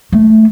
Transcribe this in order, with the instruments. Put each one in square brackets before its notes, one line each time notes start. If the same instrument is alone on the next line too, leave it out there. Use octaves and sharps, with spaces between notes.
[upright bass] A3